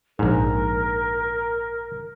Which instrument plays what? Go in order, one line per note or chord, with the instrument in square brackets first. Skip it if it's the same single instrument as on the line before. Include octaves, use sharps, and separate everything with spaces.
[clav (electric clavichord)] A#1 G#2 [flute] A#4